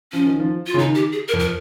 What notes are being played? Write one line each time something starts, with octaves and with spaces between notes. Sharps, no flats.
F3 C#4
D#3
F3
F4
C#3
D#3 D#4
G4
G#4
A#4
F2
A#4